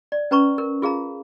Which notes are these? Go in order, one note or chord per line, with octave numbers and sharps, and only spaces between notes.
D5
C#4 B4 A#5 C#6
A#4
F4 G#4 F5 A#5